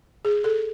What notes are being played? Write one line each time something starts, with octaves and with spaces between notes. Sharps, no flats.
G#4
A4